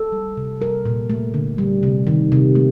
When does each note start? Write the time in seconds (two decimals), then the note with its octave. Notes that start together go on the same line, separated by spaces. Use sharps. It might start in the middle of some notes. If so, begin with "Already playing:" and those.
Already playing: A4
0.12 G3
0.37 C3
0.61 G3 A#4
0.85 A#2
1.10 A3
1.34 D3
1.58 G3
1.83 C3
2.07 D#3
2.32 C3
2.55 A3